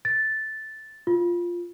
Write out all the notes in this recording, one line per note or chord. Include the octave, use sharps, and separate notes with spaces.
A6
F4